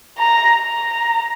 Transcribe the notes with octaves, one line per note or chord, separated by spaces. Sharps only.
A#5
A#5